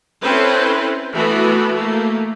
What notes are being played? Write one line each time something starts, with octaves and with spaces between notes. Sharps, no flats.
C4 C#4 E4 A4 B4 C5
E3 A3 B3 F#4
A3 A#3